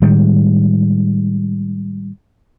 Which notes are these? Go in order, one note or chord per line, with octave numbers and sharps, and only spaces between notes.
A2 D#3 G3 G#3